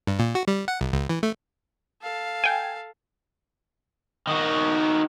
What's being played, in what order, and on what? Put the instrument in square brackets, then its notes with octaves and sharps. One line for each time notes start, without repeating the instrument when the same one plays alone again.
[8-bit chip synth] G2
A#2
F#4
G3
F#5
C2
C#2
E3
A3
[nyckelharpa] A4 F5
[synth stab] G5 G#5
[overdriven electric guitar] D#3 F#4